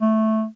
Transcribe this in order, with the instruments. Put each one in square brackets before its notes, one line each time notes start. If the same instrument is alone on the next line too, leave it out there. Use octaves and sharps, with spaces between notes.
[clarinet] A3